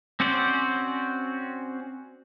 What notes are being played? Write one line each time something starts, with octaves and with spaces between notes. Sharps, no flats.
C4 C#4 F#4 C5 D5